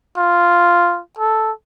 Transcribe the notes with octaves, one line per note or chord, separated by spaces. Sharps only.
F4
A4